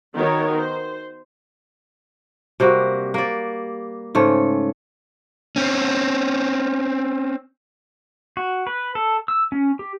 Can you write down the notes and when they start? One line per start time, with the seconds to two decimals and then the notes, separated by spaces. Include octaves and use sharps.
0.15 D#3 B3 D#4 F#4 A#4 C#5
0.59 C5
2.60 C3 G3 A#3 F#4
3.14 A#3 D5
4.15 G#2 C#3 A3
5.56 C4 C#4
8.37 F#4
8.67 B4
8.95 A4
9.28 E6
9.52 C#4
9.79 G4